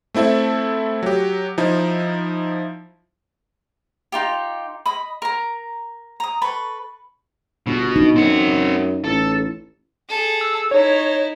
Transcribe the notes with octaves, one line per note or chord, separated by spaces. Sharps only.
A3 C4 E4 A4 E5
F#3 G4
F3 D#4 E4
D#4 F4 G4
D#5 B5
A#4 A#5
A#5 D#6
A4 B4 B5 C#6
G1 B2
D#4
F#2 C4 F#5
A1 A4
G#4 A4
E6
D#4 E4 C#5